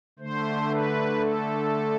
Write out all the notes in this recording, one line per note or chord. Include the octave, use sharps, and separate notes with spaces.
D3 A3 C5
B4
A4